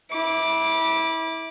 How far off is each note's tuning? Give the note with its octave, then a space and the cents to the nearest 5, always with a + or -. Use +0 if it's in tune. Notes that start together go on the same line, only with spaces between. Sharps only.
E4 -25 D6 +0